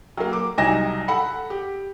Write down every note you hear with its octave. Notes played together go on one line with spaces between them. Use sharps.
F#3 A#3
D6
C2 F#3 D#4 G#5 A#6 E7
A4 F#5 B5
G4